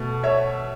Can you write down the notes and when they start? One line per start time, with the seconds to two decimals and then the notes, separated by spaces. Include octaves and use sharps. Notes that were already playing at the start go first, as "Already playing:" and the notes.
Already playing: B2 A3
0.23 C#5 E5